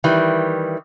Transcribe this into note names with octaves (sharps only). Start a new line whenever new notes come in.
D#3 E3 G3